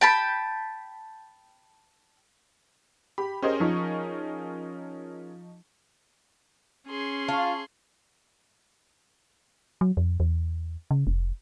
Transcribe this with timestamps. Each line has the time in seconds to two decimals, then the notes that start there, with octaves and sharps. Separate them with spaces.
0.01 G5 A5 B5
3.18 G4 B5
3.42 C#4 G4 G#4 A#4 C5 D#5
3.60 F3 D#4 C#6
6.88 C#4 G#4 C6
7.28 F4 A5 C#6
9.81 F#3
9.97 F2
10.20 E2
10.91 C#3
11.07 F1